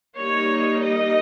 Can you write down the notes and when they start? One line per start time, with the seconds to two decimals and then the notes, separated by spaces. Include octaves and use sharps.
0.17 G3 A#3 D#4 C#5
0.81 D#5